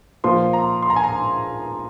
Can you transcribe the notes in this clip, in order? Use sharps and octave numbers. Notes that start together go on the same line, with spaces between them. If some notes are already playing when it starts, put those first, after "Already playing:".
A#2 F3 C6
A#5
C6
A#5
G#5
A#5